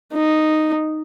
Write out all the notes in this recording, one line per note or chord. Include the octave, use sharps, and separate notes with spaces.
D#4